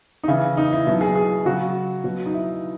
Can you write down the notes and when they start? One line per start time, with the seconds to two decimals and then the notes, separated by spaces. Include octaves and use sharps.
0.24 D#4
0.28 C#3 E3 E4
0.57 D#4
0.73 E4
0.87 B2 F#3 E4
1.01 G#4
1.16 G#4
1.45 C#3 F#3 F#4
2.04 B2 F#3
2.26 D#4
2.34 E4